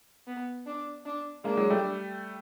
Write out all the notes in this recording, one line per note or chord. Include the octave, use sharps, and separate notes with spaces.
B3
D4
D4
G#3 A#3 D4
F#3 G#3
G3 A3